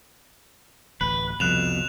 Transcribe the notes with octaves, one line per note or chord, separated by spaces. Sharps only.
D1 A1 B4
C2 F2 B2 F#6 E7 F7